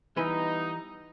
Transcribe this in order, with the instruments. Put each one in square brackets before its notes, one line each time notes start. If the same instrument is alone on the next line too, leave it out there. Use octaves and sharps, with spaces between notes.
[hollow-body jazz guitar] E3 B4 [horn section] G3 B3 D#4